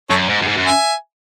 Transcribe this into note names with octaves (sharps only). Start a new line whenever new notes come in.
F#2 A4 C#5
G#2
F#2
G#2
F#2
E5 G#5